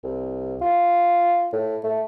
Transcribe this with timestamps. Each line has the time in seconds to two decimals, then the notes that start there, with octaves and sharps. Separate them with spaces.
0.04 C2
0.62 F4
1.53 A2
1.84 A3